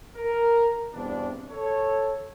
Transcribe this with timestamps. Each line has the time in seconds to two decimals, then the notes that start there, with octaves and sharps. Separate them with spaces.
0.16 A#4
0.93 E2 G2 B2 C4 D4
1.50 A4 C#5